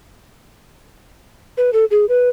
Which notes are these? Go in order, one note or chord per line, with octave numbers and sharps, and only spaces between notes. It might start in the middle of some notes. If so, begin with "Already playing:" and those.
B4
A4
G#4
B4